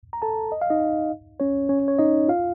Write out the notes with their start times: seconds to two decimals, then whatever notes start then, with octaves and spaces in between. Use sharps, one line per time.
0.13 A#5
0.22 A4 A5
0.52 D#5
0.62 F5
0.70 D#4 D#5
1.40 C#4 C#5
1.69 C#4 C#5
1.88 C#5
1.99 D#4 D#5
2.28 F4 F5